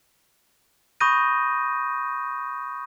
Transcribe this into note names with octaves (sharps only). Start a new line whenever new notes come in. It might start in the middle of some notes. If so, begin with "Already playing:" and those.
B5 C#6 D#6 G6 A#6 D#7